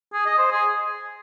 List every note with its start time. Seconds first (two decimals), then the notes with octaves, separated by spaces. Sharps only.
0.13 G#4
0.26 D#5
0.38 C5
0.51 G#4